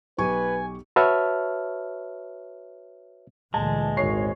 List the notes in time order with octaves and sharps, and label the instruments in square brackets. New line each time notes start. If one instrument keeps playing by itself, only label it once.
[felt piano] B1 G4 C#6 [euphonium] B4 [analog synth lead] G#5
[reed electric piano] F#4 B4 C#5 E5 A5 F6
[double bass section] D2 A#2 E3 [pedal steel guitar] G#3 [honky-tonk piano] A5
[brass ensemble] G#1 [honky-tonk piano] C#5 C7